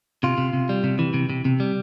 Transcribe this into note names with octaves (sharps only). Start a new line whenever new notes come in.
C3 F4
C3
C3
G3
C3
E3
C3
C3
C3
G3